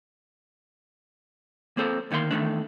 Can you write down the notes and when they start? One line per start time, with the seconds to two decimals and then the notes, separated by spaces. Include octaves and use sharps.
1.77 A#3 C4 A4 C5
2.11 D2 D#3 A#3 C#5 C6
2.31 E2 D#3 A3 D4